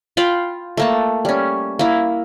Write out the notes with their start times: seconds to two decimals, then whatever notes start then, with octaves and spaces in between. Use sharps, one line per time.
0.17 F4 F5 G5 B5
0.77 A3 A#3 A5
1.25 G3 C#4
1.79 A#3 E4